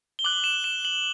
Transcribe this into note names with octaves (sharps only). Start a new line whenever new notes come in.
G7
D6 F#6 F#7
E7
E7
F#7